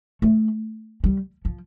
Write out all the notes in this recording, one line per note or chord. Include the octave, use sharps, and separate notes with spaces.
A3
G3
F3